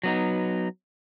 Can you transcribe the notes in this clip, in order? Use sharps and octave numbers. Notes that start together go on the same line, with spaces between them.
F#3 B3 D#4